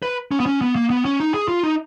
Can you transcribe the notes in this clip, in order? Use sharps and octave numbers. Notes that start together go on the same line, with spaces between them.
B4
C#4
B3
C#4
B3
A#3
B3
C#4
D#4
G#4
F4
D#4